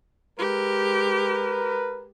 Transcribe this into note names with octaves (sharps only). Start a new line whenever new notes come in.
G#3 G4 A#4 B4